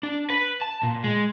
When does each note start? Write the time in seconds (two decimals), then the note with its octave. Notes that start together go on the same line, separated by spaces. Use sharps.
0.03 D4
0.30 B4
0.61 A5
0.83 A#2
1.04 G#3